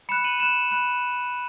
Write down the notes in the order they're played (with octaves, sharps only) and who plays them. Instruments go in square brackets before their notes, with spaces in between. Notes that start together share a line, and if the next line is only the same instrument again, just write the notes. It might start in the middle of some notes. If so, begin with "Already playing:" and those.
[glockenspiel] B5 F#6 C#7 E7
D#7 F#7
B5 F#6 C#7 E7
B5 F#6